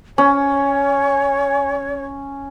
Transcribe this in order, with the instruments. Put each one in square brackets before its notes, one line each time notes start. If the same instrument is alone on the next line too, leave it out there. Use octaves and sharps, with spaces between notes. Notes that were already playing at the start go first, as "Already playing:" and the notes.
[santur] C#4 [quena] C#5 [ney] G#5